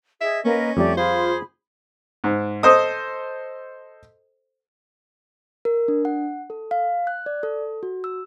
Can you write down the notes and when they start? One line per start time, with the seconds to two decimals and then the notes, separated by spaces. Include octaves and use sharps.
0.21 G#4 D#5 E5
0.45 A#3 C#4 A#4 B4 D#5
0.77 F2 G3 A3 G4 D5
0.97 F4 G#4 C5 B5
2.24 G#2
2.63 A4 C5 D#5 D#6
5.65 A#4
5.88 D4
6.05 F#5
6.50 A4
6.71 F5
7.07 F#6
7.26 D5
7.43 A4
7.83 F#4
8.04 E6